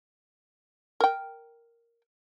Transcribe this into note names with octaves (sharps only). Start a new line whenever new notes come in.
A#4 G5